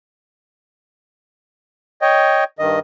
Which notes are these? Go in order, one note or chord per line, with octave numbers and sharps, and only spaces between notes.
C#5 D#5 G5
G2 D#3 D#5